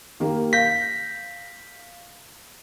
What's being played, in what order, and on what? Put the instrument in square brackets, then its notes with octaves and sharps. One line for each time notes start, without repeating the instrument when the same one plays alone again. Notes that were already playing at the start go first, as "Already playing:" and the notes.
[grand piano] D#3 A#3 G4
[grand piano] F5 G6 A#6 [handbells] B6